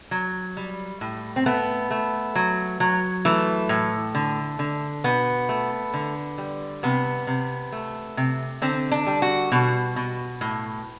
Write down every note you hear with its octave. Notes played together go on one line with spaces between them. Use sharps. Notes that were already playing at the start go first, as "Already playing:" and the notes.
F#3
G3
A2
C4
A3 B3
A3
F#3
F#3
E3 A3
A2
D3
D3
B2 B3
A3
D3
G3
C3 B3
C3
A3
C3
D3 C4
D4
G3
F#4
B2
B2
A2